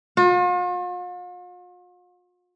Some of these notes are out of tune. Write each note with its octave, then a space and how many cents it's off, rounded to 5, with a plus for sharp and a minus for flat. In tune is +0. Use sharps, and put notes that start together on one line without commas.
F4 +45